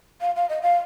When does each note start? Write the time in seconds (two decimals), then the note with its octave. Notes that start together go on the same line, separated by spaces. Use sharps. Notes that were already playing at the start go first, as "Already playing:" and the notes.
0.21 F5
0.36 F5
0.49 D#5
0.62 F5